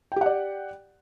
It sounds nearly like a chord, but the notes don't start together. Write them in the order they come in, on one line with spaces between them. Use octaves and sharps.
G5 G4 F#5 D5